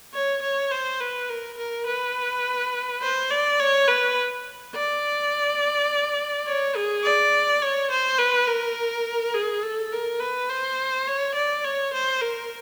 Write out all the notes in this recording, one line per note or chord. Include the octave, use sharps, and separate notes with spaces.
C#5
C#5
C5
B4
A#4
A#4
B4
C5
D5
C#5
B4
D5
C#5
G#4
D5
C#5
C5
B4
A#4
G#4
A4
A#4
B4
C5
C#5
D5
C#5
C5
A#4